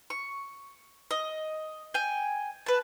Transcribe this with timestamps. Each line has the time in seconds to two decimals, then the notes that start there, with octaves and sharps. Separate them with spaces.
0.10 C#6
1.11 D#5
1.94 G5 G#5
2.66 B4 A5